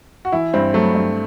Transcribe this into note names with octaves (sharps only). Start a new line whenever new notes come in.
F#4
E3 E4
G2 C4
F#3 A3
G2